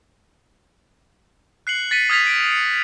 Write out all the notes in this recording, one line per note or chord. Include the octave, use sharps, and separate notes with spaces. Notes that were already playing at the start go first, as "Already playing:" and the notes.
F#6 C7 C#7 F#7
A6 B6 C#7 D#7
D#6 F6 G#6 A6 B6 F7
D7
C#7